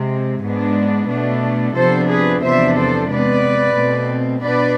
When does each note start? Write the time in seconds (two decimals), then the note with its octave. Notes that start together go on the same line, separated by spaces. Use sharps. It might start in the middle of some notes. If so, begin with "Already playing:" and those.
Already playing: C3 G#3 C4
0.42 G#2 G#3 B3 D4
1.08 B2 A3 D4
1.75 C3 F3 B3 D4 A4 C5
2.09 G#4 B4
2.42 E2 C3 F3 B3 D4 C5 E5
2.76 A4 C5
3.09 C3 G#3 B3 B4 D5
3.76 B2 A3 C4
4.42 B2 B3 D4 B4 D5